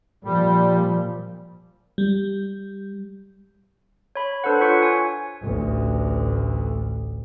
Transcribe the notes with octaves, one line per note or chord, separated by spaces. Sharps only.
A#2 F3 G3
G3
C#5 B5
D4 A4 B4 C5 F#5
F4 C#5 C#6 C#7
G#5
A1 D2